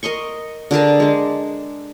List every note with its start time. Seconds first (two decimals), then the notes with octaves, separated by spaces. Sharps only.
0.03 A#4 D#5 C6 C#6
0.71 D3 G#4 A#4 A5
1.00 G#3 D4